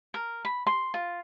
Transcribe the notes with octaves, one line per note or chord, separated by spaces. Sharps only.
A#4
B5
C6
F4